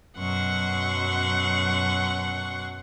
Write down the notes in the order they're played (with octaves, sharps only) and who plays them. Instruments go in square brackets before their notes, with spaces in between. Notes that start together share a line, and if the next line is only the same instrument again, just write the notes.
[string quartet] F#2 B2 F#3 F#5 C6 C#6